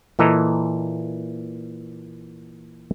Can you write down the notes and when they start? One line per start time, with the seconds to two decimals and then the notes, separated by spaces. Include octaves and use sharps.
0.19 A#2 E3 A4 D#5 A#5